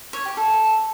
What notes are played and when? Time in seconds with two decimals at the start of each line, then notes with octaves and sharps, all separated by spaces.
0.13 C#5
0.25 G4
0.37 A4